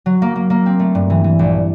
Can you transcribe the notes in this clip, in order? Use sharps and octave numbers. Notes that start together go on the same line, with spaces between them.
F#3
A#3
A#3
A#3
C4
A3
G2
E3
E3
A#1